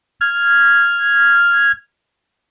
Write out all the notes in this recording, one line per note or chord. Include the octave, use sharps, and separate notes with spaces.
F6 G#6